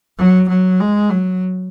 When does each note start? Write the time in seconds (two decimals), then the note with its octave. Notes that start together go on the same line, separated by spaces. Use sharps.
0.18 F#3
0.49 F#3
0.80 G#3
1.10 F#3